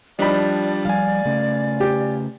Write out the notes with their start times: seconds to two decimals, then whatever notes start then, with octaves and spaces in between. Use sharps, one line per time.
0.19 F3 G3 D4 D#4 D5 B5
0.85 F3 G3 F5 G#5
1.25 C#3 A3 C#4
1.80 G4